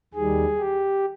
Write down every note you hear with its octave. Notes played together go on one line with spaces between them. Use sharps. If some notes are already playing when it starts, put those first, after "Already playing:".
D#2 D#3 G3 G#4
G4